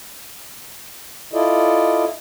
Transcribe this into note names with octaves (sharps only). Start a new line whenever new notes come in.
E4 F4 A4 D5 D#5